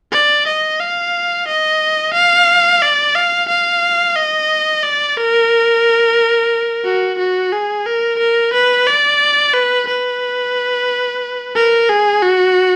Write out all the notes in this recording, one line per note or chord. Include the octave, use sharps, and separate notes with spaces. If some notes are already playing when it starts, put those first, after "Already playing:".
D5
D#5
F5
D#5
F5
D5
F5
F5
D#5
D5
A#4
F#4
F#4
G#4
A#4
A#4
B4
D5
B4
B4
A#4
G#4
F#4